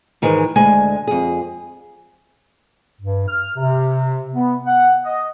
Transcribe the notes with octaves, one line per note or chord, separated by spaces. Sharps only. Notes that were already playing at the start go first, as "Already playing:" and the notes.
G#2 D#3 E3 G#3
D2 G#3 G#5
F2 G#4
G2
F6
C3
B3
F#5
D#5